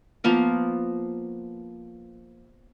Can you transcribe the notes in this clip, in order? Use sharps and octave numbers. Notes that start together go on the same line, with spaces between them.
F3 A#3 B3 A#4